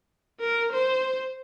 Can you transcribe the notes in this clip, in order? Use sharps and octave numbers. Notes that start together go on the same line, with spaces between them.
A#4
C5